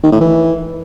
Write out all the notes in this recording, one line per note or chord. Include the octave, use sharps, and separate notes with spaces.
D#3
A2
E3